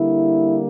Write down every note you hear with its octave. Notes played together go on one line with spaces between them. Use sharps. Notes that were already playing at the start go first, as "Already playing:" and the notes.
Already playing: D3 G3 A#3 E4